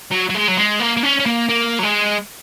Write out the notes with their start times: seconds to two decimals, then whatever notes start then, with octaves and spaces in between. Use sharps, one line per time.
0.12 F#3
0.30 F#3
0.35 G#3
0.48 F#3
0.57 G#3
0.80 A#3
0.97 A#3
1.03 C#4
1.20 C#4
1.26 A#3
1.49 A#3
1.79 F#3
1.83 G#3